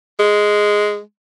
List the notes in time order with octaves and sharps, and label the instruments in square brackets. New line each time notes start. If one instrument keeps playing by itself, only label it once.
[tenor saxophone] G#3